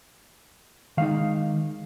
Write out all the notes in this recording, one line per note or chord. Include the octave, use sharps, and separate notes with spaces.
D#3 G#3 D#4 F5